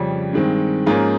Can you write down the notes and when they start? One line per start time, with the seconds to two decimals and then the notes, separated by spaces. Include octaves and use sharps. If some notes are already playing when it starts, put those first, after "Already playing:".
Already playing: F2 C#3 G3 C#4
0.33 G2 D#3 G#3 C4
0.86 G#2 F3 A#3 C#4 F4 G#4